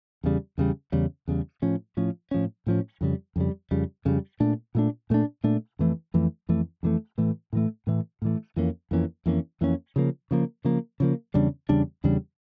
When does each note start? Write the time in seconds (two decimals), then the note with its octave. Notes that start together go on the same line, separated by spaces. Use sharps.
0.24 E2 C#3 G3
0.58 E2 C#3 G3
0.92 E2 C#3 G3
1.28 E2 C#3 G3
1.62 A2 F3 C#4
1.97 A2 F3 C#4
2.31 A2 F3 C#4
2.67 A2 F3 C#4
3.01 F2 C#3 G3
3.36 F2 C#3 G3
3.71 F2 C#3 G3
4.05 F2 C#3 G3
4.40 A#2 A3 D4
4.75 A#2 A3 D4
5.10 A#2 A3 D4
5.44 A#2 A3 D4
5.79 F2 E3 A3
6.14 F2 E3 A3
6.49 F2 E3 A3
6.83 F2 E3 A3
7.18 A2 E3 A3
7.53 A2 E3 A3
7.87 A2 E3 A3
8.22 A2 E3 A3
8.56 F2 E3 A#3 C#4
8.91 F2 E3 A#3 C#4
9.26 F2 E3 A#3 C#4
9.61 F2 E3 A#3 C#4
9.96 C#3 F3 A#3
10.31 C#3 F3 A#3
10.65 C#3 F3 A#3
11.00 C#3 F3 A#3
11.34 E2 C#3 G3 D4
11.69 E2 C#3 G3 D4
12.04 E2 C#3 G3 D4